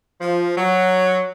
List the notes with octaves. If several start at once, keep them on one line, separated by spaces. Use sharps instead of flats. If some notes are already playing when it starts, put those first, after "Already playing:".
F3
F#3